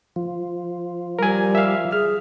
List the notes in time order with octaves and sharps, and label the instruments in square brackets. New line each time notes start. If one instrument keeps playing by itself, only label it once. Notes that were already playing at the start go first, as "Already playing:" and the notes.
[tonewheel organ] F3
[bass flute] G3 [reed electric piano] A#4 G#5
[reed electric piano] E5 F5
[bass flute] G#4 [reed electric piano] F6